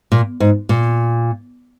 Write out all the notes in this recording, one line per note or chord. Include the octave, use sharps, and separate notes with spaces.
A#2
G#2
A#2